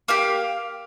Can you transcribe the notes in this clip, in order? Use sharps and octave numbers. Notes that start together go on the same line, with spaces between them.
A#3 G4 F5